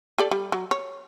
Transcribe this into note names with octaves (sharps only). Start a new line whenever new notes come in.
G4 A4 D5
G3
F#3
C#5